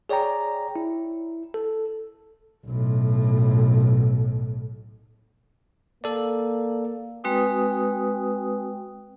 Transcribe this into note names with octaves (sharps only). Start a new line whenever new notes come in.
G#4 C#5 D5 G5 A#5
E4
A4
B1 A2
A#3 A4 D5
G#3 C4 F#4 B4 G5 D#6